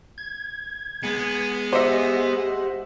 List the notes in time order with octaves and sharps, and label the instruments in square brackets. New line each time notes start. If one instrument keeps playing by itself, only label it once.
[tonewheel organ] G#6
[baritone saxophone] G#3 [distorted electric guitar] B3
[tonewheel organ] G4 F#5 [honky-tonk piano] C5 D#5 E5